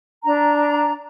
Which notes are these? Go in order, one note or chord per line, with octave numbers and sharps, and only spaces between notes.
D4 A#5